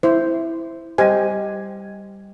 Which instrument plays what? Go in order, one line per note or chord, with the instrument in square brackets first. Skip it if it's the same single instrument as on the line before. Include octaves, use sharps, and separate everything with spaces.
[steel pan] E4 C5
[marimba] G3 D#5 [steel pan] G4 C5 G#5